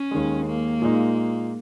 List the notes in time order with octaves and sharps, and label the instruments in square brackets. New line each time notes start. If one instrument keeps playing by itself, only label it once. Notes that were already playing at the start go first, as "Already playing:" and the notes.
Already playing: [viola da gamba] C#4
[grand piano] D#2 D#3 G#3
[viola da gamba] A#3
[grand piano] A#2 G#3 D#4